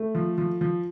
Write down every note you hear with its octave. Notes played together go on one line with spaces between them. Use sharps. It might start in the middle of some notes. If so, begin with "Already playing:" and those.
Already playing: A3
F3
F3
F3